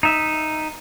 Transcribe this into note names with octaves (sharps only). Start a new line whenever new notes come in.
D#4 E5